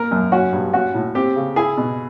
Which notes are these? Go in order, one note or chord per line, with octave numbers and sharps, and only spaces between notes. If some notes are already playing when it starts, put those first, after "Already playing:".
Already playing: A#3 A#4
F#2
C#4 F#4
G2
C#4 F#4
A2
C4 G4
C#3
E4 G#4
B2